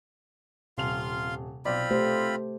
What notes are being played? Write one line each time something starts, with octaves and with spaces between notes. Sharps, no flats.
D#1 C3 F4 F5 C6 F7
B1 C4 F4 D5 B5
A3 G4 C5